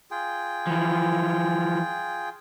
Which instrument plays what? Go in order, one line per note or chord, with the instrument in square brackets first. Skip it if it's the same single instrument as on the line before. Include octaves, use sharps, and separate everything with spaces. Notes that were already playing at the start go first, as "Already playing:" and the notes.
[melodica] F4 G#4 G5
[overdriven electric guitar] E3 F3